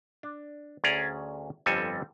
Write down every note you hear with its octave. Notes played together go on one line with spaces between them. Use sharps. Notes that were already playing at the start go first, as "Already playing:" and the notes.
D4
D2 C#4 G#4 D5 A#5
G1 F2 G3 C4 A4 G#5